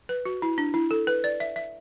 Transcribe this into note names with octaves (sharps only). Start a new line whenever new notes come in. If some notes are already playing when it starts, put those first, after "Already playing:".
B4
F#4
E4
D4
E4
A4
B4
D5
E5
E5